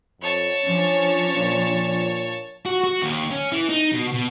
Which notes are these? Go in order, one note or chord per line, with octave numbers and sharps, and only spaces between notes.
F2 C#5 A5
F3 C#4 D4
A#2
F#4
F#4
D#2
C#4
E3
D#4
B2
B2